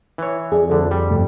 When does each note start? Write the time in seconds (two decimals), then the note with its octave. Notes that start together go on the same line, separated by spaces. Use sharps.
0.18 E3 C#5
0.52 F2 G#4 D5
0.70 D2 D3 A4 D5
0.91 G3
1.10 G2 C3 A3